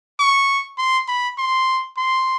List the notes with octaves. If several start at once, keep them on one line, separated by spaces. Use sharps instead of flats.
C#6
C6
B5
C6
C6